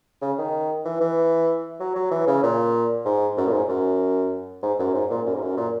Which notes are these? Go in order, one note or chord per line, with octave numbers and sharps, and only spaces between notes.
C#3
D#3
E3
E3
F#3
F#3
E3
C#3
A#2
G#2
F#2
A#2
G#2
F#2
G#2
F#2
G#2
A#2
F#2
G#2
F#2
A#2